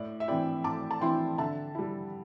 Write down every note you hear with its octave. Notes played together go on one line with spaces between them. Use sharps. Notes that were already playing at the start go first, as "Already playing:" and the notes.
Already playing: A2 D5
E5
E3 C4 E4 D5 G5
A2 A5 D6
A5
E3 C4 E4 G5 C6
D3 E5 A5
G3 E4